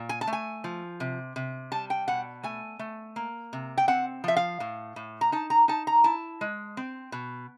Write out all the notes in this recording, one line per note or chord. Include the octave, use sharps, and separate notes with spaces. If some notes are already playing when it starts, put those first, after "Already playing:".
Already playing: A#2
G#5
A5
A3
G#5
F3
C3
C3
G3 A5
G5
B2 F#5
A3 G#5
A3
A#3
C3
G5
C4 F#5
F3 E5
F5
A2
A2
A#5
D#4 A5
A#5
D#4 A5
A#5
E4 A5
G#3
C4
B2